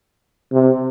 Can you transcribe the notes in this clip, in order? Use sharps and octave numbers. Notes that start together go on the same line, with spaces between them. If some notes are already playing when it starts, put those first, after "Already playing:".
C3